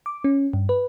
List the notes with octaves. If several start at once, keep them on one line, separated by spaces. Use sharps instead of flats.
D6
C#4
G2
B4